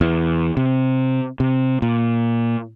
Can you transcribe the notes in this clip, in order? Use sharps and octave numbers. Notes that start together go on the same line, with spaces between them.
E2
C3
C3
A#2